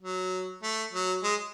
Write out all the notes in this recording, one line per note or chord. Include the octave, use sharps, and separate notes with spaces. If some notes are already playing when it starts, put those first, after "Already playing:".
F#3
A3
F#3
G#3